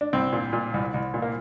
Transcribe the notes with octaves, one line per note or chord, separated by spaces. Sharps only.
D4
C2 C4
A#2
A#2
C2
C2
A#2
A#3